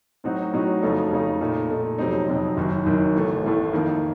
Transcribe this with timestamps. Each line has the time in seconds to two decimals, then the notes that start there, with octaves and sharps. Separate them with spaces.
0.24 A2 F#3 C4 D#4 F#4
0.53 A2 F#3 C4 D#4 F#4
0.82 F2 C#3 A3 D#4
1.11 F2 C#3 A3 D#4
1.41 A#2 A3 D#4
1.69 A#2 A3 D#4
1.98 F2 C3 F#3 C4 D#4
2.28 F2 C3 F#3 C4 D#4
2.57 F#1 F#2 D#3
2.86 F#1 F#2 D#3
3.15 A1 A2 A3
3.44 A1 A2 A3
3.73 F2 D#3 A#3